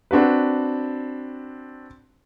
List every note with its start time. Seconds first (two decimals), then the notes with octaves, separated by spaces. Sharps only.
0.11 C4 D4 F#4 B4